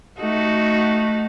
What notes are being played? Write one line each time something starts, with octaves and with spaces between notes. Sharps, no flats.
A3 D#4 F#4